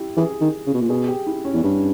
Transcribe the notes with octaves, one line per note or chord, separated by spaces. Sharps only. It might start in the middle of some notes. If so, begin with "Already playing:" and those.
Already playing: E4 G4
E3 G#4
D#3
C#3
B2
A#2
B2 G#4
G4
E4
C#4
E2
G2 C#4